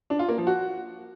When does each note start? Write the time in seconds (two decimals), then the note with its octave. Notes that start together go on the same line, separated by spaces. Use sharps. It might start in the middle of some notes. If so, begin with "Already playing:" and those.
0.10 D4
0.19 F4
0.28 A#3
0.38 F3
0.47 F#4